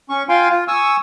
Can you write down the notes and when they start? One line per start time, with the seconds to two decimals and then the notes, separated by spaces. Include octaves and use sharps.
0.10 C#4 C#6
0.29 F4 F5 G5 G#5 C6
0.49 F4
0.68 G#5 C#6 D#6 E6